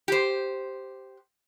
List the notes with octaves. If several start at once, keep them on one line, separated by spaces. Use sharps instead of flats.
G4 C5